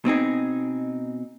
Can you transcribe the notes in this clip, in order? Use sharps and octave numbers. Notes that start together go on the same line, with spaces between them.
B2 C4 D#4 G#4